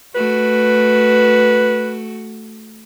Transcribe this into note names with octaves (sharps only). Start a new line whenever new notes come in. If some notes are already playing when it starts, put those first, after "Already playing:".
A3 F#4 B4